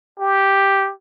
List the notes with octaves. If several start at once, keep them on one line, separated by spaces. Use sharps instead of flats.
G4